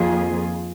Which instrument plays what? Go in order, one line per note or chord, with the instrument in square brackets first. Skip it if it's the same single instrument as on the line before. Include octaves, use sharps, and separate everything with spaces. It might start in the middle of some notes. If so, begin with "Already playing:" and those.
Already playing: [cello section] F2 D#3 A#3 F4 G#4